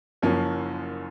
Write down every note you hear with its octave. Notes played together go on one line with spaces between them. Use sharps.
F#1 F#2 F3 A#3 C#4